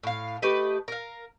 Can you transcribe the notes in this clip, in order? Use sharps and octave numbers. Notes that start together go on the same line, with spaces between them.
A2 F5
A3 G4 B4 D#5
A#4 F5